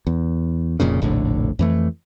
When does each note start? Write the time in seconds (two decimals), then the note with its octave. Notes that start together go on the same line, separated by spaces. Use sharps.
0.07 E2
0.80 F1 F2 A#2 C#3
1.02 F1 A#1 A2 D3
1.59 F2 E3 A3